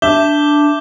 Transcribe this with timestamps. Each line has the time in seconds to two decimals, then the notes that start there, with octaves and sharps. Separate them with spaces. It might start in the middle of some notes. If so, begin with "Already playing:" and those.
0.02 D4 E5 D6 G6 G7